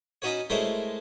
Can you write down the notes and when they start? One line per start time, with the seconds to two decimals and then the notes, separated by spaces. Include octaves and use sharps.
0.22 C#4 D#4 F#4 B4 C#5
0.50 G#3 A3 E4 A#4 C5 C#5